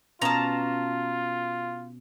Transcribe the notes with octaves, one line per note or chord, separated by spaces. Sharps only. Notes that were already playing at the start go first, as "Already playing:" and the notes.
B2 C#4 F4 A5 A#5